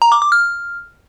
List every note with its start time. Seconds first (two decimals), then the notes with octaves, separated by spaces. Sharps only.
0.02 A#5
0.12 D6
0.22 D6
0.32 F6